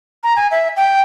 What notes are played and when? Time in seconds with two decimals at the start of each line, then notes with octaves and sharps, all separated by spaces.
0.24 A#5
0.36 G#5
0.51 E5
0.77 G5